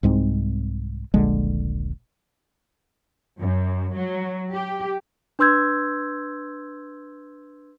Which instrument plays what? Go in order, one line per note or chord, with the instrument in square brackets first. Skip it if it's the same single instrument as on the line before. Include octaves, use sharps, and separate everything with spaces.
[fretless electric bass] C2 G#2 G#3 C4
D#1 A#1 D3 G#3
[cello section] F#2
F#3
G4
[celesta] D4 B4 C6 E6 G6 G#6